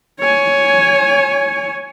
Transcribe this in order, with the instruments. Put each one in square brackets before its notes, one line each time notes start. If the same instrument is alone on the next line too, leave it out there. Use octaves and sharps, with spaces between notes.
[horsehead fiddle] C#5 G#5